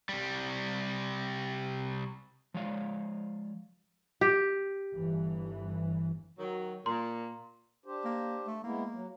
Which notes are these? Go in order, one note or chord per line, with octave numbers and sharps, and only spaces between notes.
C3 G3
F3 G#3 C#5 D5 F5
G4
G1 E3
D#3 F#3
A#2 A#5 C6
D4 G4 C5
A#3
A3
G#3 A#3 B3 E4
F#3